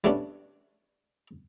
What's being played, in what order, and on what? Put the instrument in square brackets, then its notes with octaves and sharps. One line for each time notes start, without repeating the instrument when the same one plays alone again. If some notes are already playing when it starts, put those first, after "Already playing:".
[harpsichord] G3 A3 B3 C#4 D4